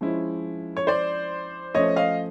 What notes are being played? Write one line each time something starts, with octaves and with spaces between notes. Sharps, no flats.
F3 G#3 C#4 E4
C#5
C5 D5
F3 A3 C#4 C#5 D#5
D#5 F5